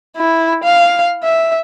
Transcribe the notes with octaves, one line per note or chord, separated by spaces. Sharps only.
E4
F5
E5